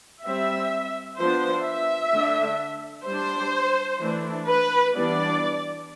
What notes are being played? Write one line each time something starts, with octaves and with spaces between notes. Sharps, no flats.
G3 C4 E5
F3 B3 D4 C5
E5
D3 A3 D4
G3 D4 C5
E3 A3 D4
B4
E3 G3 B3 D4 D5